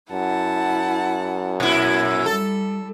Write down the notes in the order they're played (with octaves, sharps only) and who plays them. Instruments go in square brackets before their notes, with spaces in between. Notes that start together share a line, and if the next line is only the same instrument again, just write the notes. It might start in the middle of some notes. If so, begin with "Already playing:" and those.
[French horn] F#2 [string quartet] E4 F#5 A5
[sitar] A#2 E4
[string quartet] G3 [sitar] A4